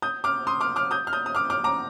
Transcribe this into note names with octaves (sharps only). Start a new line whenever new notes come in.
D#6 G6
D6 F6
C6 D#6
D6 F6
D6 F6
D#6 G6
F6
D#6 G6
D#6
D6 F6
D6 F6
A#5 D6